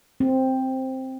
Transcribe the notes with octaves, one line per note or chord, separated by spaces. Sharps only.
C4